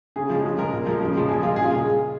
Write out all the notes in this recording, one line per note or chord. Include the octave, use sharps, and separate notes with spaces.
C#3 G#4
F3 G#3
C#3
G#3 A#4
A#2
F3 G#3
C#3
F3 G#3
A#2 G#4
G#3 F4
C#3 G#4
F4
G#3 G#4